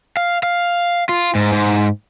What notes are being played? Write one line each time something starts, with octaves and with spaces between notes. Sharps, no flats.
F5
F5
F4
G#2
G#2